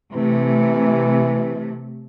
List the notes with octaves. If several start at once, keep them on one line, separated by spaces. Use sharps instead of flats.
C3 E3 A3